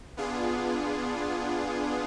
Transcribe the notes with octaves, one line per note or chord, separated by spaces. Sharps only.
B3 D4 F4 G#4